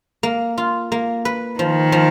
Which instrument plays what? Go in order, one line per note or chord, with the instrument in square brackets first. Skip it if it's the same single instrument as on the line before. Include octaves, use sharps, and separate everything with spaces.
[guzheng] A#3
F4
A#3
B4
[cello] D#3 [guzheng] F3
[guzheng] F3